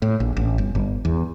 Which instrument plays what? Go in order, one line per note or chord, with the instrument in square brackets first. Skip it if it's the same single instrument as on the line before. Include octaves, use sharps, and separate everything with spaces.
[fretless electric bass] A2
A#1
A1
G1
G1
E2